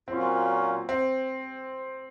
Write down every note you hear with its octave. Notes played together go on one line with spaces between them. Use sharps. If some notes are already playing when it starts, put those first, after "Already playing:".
A#2 F#3 C4 C#4 F4
C4